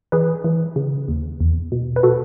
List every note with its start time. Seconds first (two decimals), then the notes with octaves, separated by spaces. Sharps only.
0.12 E3 G#4 B4
0.44 E3
0.76 C#3
1.08 D#2
1.40 E2
1.72 B2
1.96 B4
2.03 B2 F#4 A4